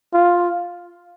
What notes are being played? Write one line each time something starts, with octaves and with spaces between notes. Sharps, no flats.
F4